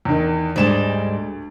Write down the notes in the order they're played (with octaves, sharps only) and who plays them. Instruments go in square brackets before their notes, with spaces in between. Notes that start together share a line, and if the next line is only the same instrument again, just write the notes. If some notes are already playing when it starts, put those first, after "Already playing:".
[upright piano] E2 D#3
[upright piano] D2 E7 [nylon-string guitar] G#2 G3 G#3